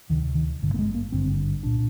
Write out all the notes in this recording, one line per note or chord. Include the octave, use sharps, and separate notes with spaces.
D2 C3 D#3
D#3
G#1 G2 D3
A#3
G#3
A#3
G#1 G2 D3 C4
C2 A#2 D4